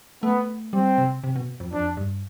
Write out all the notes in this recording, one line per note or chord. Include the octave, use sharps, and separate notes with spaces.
A3 B3
G3 C4
C3
C3
B2
F2
F2 D4
G2